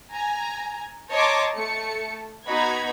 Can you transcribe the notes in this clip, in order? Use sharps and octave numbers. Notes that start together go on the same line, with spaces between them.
G#5 A#5
C#5 D#5 A5 A#5 C6 D6
A3 A5 C#7
B3 D#4 F#4 A#5 B5 G#6